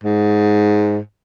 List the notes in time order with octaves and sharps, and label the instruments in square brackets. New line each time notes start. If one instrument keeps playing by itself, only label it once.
[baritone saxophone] G#2